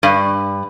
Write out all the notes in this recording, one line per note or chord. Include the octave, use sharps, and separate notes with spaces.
G2